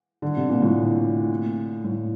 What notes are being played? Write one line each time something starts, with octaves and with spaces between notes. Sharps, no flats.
D3
C3
A#2
A2
A2